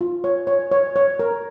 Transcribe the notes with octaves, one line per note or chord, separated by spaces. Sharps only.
F4
C#5
C#5
C#5
C#5
A#4